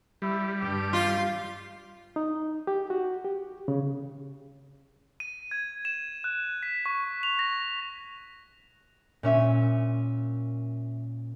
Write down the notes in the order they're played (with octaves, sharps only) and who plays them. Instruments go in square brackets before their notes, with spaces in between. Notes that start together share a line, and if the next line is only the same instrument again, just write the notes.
[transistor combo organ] G3 [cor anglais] E4
[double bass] G2 [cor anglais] G4
[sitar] F4
[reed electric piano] D#4
G4
F#4
G4
C#3
[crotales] D#7
G#6
E7
F#6
B6
C#6
F7
A#6
[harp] A#2 C#4 E5 D#7